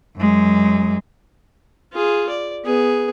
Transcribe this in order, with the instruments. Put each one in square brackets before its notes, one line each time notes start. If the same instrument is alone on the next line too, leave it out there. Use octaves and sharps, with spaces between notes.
[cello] F#2 G#3
[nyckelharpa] F4 G#4
D5
B3 G#4